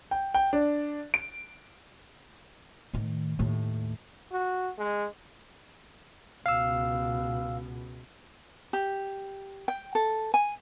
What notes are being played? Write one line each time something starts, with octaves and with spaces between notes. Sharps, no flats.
G5
G5
D4
D7
A2 D#3
D#2 A2
F#4
G#3
C#2 B2 F5 E6
G4
G5
A4
G#5